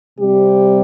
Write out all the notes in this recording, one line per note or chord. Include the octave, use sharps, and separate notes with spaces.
C3 G3 C4 G4